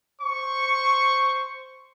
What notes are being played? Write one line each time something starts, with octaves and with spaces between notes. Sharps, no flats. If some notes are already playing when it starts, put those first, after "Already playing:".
C5 C#6